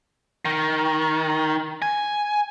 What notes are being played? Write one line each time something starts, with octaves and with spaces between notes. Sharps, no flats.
D#3
G#5